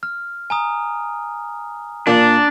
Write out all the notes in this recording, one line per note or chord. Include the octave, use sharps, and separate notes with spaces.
F6
G#5 A#5 D#6
A#2 D4